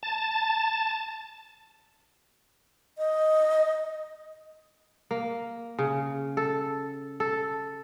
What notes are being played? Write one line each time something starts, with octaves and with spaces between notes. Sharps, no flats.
A5
D#5
A#3
C#3
A4
A4